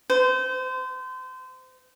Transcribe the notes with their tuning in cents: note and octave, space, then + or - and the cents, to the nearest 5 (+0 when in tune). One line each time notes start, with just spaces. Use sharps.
C5 -30